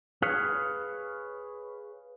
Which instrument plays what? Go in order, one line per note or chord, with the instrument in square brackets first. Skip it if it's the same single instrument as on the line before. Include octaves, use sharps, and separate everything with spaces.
[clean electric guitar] G#4 B4 C#5 F5